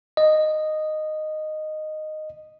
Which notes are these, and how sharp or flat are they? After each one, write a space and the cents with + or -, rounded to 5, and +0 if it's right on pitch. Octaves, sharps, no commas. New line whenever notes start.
D#5 -10